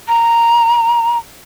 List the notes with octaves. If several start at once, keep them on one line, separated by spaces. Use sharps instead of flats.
A#5